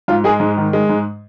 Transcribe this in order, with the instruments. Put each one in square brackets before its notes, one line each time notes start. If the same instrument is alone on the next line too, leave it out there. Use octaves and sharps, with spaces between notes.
[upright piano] G#2 F4
G#3 G#4
G#2
D#3
G#3
G#2